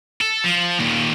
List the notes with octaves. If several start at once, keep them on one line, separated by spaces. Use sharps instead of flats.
A4
F3
D#2 A#2